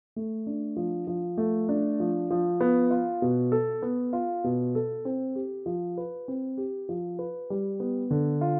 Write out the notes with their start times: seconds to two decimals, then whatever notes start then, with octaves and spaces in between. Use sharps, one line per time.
0.16 A3
0.46 D4
0.76 F3
1.07 F3
1.38 A3
1.69 D4
2.00 F3
2.30 F3
2.61 B3
2.90 F4
3.22 B2
3.52 A4
3.82 B3
4.13 F4
4.44 B2
4.75 A4
5.05 C4
5.35 G4
5.66 F3
5.97 B4
6.28 C4
6.57 G4
6.89 F3
7.19 B4
7.50 G3
7.80 B3
8.11 D3
8.41 F4